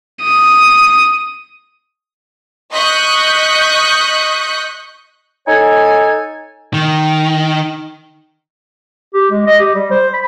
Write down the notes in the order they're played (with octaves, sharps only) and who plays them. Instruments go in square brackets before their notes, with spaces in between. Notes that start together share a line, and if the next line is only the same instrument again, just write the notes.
[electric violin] D#6
[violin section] D#5 C#6 D#6 F#6 G6 B6
[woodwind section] D#4 A4 C#5 G#5
[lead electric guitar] D#3
[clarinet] G4
G#3
D#5
G4
G3
C5
B5